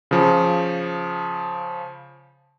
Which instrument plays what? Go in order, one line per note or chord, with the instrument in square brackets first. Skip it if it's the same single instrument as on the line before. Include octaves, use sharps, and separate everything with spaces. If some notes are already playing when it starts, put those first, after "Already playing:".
[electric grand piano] C#3 F3